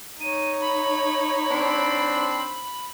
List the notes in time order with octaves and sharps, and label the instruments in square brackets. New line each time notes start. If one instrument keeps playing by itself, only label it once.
[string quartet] D#4 C#5 [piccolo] D#7
[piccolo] B5
[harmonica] C4 D4